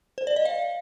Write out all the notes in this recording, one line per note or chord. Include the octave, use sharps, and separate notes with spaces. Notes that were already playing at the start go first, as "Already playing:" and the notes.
C5
D5
D#5
F5